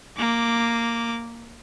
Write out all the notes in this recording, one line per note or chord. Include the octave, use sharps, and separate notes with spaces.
A#3 D6